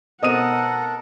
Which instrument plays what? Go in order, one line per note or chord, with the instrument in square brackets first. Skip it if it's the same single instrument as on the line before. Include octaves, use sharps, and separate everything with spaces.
[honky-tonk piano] B2 C4 [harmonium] A4 A#4 [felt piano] D#5 D#6 D#7 [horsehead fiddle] F#5